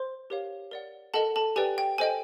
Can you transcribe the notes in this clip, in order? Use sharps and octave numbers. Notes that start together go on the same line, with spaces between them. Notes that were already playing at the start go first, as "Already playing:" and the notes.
Already playing: C5 C6
G4 A#4 C#5 F5
A#4 D5 F#5
A4 A#4 D#5 F#5 A5
A4 A5
G4 B4 D5 G5 G#5
G5
A4 C5 D#5 G5 G#5